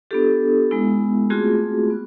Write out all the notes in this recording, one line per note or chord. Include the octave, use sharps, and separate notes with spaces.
B3 D4 F4 G4 A4
G#3 B3 E4
A3 C4 F4 F#4 G#4
B3